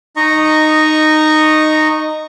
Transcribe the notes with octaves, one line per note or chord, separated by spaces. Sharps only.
D#4 D#5 A#5 C#6